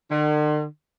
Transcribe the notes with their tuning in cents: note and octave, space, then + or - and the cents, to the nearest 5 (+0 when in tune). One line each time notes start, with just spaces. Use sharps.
D3 +45